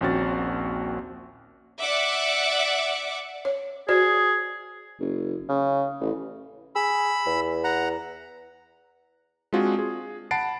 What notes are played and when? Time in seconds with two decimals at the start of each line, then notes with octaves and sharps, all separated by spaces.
0.01 A#1 D#2 C4 C#4 F#4 A6
1.81 D5 E5 F#5 D6
3.45 C#5
3.89 F#4 G#4 C5 D5
5.00 F#1
5.49 C#3
6.01 A1
6.75 G#4 B5 E6
7.26 E2
7.64 F#5 A#5
9.53 G#3 C4 D4 F4 F#4 G#4
9.79 G#4
10.31 F#5 A5 B5 A6 C7 D7